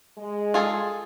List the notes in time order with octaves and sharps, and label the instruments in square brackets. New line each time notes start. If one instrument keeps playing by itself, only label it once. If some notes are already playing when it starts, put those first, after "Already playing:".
[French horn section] G#3
[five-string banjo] F4 G#4 A4